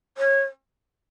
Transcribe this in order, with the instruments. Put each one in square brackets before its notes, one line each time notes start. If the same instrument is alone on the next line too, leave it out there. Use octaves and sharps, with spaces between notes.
[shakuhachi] C#5